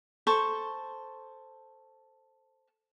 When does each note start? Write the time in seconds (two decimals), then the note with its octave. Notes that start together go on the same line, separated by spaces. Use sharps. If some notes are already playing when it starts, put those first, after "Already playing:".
0.27 A4 C5 C#6